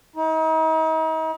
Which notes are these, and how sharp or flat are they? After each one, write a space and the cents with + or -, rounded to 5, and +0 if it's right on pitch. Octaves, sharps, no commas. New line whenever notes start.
D#4 +40